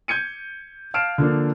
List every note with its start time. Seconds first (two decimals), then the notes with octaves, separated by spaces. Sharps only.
0.08 G6 G#6 C#7 D#7
0.94 F5 A5 F6 C7 D7 E7
1.18 D3 F3 A#3 D4